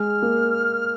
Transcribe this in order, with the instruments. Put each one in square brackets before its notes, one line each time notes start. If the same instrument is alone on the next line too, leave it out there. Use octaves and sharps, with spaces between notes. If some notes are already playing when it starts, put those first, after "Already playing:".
Already playing: [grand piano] G#3 [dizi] F6
[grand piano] A#3